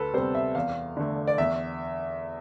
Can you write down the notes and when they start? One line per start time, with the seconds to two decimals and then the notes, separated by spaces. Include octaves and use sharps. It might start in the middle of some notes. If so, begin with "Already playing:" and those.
Already playing: D2 A4 B4
0.13 C3 G3 B3 C5
0.35 E5
0.55 E2 F5
0.97 D3 A3
1.27 D5
1.38 E2 E5